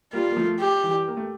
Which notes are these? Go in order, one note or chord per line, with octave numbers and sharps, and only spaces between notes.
G3 A#3 F4
A#3
F3 A3
G4
E3 G3
A#3
A3